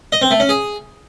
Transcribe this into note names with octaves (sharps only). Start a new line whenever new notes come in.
D#5
C4
A3
C#4
G#4